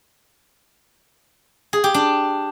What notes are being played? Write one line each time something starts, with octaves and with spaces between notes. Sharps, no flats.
G#4
G4
D4